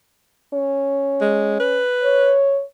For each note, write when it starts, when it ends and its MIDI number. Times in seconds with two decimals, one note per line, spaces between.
0.54 1.82 61
1.21 1.55 56
1.60 2.33 71
2.03 2.62 73